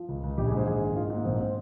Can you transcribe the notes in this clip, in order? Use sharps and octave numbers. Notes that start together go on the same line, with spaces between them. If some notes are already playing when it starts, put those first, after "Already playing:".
Already playing: F3
C#2
C#2
A#1 G4
G#4
G#2
C5
A#1 G#4
D#3
G#2 F4
F4
G#2
A#3
A#1 C4
C4